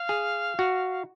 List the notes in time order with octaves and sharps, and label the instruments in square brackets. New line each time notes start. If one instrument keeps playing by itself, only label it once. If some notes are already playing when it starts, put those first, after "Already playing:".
Already playing: [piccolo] F5
[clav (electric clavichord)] G#4
F#4